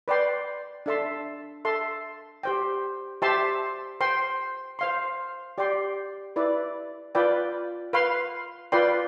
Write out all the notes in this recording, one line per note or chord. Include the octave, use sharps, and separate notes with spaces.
B4 D5 G5 C6
D4 A4 E5 A5 C6
A4 E5 A5 C6
G4 C5 G5
G4 C5 E5 A5 C6
C5 G5 C6
C5 F5 C6
G4 D5 G5 C6
E4 B4 D5
F4 B4 D5 G5
B4 F5 C6
F4 B4 D5 G5 C6